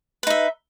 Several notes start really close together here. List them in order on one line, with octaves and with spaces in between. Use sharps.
B4 D#4 E5